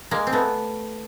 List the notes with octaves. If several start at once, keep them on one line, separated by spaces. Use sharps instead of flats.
G#3 A#3
C4
A3 B3